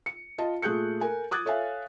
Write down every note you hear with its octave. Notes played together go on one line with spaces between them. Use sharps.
C#7
F4 D#5 A5
A#2 A3 G#4 F#6 G6 C#7
A4 A#4 G#5
D6 D#6 F#6 G#6 A6
A4 C#5 E5 F5 G#5